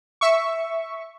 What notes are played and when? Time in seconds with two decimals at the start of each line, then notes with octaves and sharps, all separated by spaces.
0.21 E5 C#6